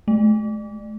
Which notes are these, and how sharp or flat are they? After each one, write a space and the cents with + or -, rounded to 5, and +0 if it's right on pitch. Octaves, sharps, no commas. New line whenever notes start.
A3 -45